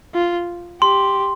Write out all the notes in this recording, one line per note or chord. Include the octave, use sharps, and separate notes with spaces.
F4
G4 C6